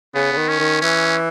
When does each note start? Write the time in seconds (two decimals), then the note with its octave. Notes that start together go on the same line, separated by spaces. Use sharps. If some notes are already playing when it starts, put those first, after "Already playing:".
0.15 C#3 B3
0.32 C#3
0.37 D#3
0.48 C#4
0.59 D#3
0.82 E3 C#4